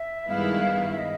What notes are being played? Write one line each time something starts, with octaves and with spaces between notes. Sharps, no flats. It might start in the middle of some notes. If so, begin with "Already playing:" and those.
Already playing: E5
G2 D#3 G#3 B3 E4 F5
E5
D#5